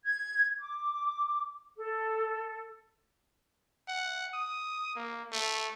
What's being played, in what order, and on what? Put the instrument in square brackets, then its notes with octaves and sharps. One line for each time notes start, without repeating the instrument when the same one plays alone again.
[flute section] G#6
D6
A4
[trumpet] F#5
D#6
A#3
A3